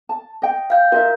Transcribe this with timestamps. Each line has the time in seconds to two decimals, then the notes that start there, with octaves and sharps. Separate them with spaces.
0.09 A5
0.42 D#5 G5
0.70 F5 G6
0.92 F4 A#4 D#5 E5